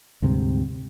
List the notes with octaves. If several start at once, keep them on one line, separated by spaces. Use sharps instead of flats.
D2 G#2 C3 G3